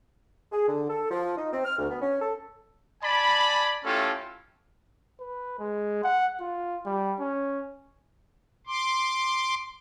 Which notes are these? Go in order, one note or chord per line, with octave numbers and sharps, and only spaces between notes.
G#4
D3
A4
F3
D#4
C4
F6
D2
B3
C#4
A4
D5 G#5 A5 B5
A3 C#4 E4 F4 G4 A4
B4
G#3
F#5
F4
G3
C#4
C6 D6